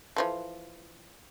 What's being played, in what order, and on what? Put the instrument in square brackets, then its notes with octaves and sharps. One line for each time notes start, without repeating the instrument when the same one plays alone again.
[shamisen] E3 F3 A4